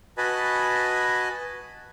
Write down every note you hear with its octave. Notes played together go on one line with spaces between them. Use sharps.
F#4 B4 D#5 G#5 A5 B5